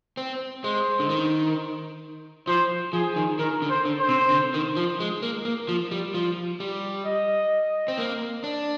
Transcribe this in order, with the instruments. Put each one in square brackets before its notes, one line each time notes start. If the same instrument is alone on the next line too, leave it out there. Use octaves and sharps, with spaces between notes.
[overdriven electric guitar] C4
[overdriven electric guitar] G#3 [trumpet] C5
[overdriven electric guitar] D3
D#3
[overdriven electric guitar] F3 [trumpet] C5
[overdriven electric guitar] F3 [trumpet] G#4
[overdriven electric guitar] D#3
[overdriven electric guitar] D#3 [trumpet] A#4
[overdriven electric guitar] D3
[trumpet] C5
[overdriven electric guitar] D3
[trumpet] C5
[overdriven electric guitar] C3
D3
D#3
F3
G#3
A#3
A#3
F3
G3
F3
G3
[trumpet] D#5
[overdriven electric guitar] C4
A#3
D4